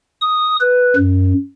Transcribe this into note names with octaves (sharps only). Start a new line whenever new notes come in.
D#6
B4
F#2